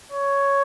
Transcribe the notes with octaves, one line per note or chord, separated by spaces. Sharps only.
C#5